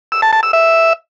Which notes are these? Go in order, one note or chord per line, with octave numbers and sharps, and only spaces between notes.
E6
A5
A5
E6
E5